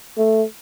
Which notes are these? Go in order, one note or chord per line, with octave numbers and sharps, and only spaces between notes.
A3